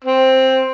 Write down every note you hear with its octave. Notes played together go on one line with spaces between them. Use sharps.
C4